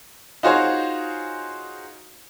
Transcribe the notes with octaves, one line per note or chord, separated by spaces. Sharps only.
D#4 F4 F#4 G#4 C5 C#5